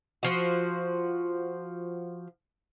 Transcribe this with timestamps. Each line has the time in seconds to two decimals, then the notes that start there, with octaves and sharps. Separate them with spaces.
0.23 F3 F#4